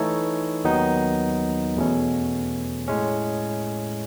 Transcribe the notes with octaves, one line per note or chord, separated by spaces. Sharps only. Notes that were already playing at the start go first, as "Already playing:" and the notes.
Already playing: E3 A3 D#4 A4 C#5
D#2 D#3 F#3 B3 D#4
E2 B2 A3 C#4
A2 G#3 C#4